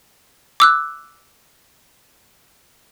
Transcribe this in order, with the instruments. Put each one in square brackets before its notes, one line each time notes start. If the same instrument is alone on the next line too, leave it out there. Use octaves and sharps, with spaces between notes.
[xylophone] D6 E6 F#6